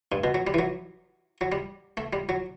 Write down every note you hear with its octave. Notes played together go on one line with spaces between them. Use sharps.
G2
B2
F#3
G3
E3
F#3
F#3
G3
A3
G3
F#3